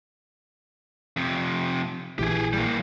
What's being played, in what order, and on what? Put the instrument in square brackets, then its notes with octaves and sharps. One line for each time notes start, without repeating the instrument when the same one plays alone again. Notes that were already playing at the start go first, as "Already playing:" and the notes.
[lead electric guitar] F2 C3
[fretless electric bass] A#1 E3 [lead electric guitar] G4 G#4
[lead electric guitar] G3 A#3